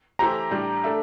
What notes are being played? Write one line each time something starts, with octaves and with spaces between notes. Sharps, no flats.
E3 A3 E4 G4 C5 A#5
A2 G3 D4 G4
A3 D4 A4 E5